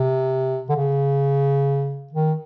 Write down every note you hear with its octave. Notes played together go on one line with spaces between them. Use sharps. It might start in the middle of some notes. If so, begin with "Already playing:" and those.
Already playing: C3
D3
C#3
D#3